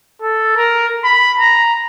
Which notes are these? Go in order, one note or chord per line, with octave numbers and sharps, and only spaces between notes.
A4
A#4
B5
A#5